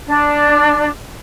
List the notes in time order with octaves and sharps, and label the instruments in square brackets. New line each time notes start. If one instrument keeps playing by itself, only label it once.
[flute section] D4